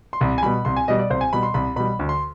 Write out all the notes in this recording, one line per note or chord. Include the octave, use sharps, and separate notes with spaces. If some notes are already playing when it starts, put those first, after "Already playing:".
C6
C2 B5
G#5
B2 G3 B5
C2 C6
G#5
B2 G3 D#5
D5
C2 C5
G#5
B2 G3 B5
C6
C2 B5
B2 G3 B5
D2
C6